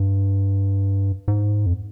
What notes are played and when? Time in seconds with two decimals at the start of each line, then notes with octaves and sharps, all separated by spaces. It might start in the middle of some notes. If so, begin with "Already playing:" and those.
Already playing: G2
1.28 G#2
1.66 F2